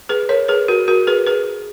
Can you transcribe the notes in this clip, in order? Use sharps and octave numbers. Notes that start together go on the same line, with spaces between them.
G#4 B4
A#4 C#5
G#4 B4
F#4 A#4
F#4 A#4
G#4 B4
G#4 B4